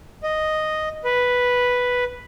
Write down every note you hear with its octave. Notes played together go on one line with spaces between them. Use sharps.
D#5
B4